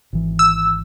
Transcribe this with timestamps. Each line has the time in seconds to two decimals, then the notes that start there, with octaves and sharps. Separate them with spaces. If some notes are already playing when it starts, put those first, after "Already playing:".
0.13 G#1 E3
0.39 E6